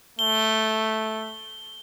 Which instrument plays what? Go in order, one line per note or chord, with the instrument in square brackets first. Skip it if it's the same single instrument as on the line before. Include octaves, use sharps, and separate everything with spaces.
[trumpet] A3 [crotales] G7